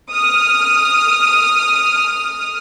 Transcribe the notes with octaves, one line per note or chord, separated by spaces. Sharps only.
D#6 F6